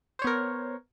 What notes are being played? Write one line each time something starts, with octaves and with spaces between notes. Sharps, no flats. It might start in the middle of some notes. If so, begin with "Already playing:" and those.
B3 A#4 C5 C#5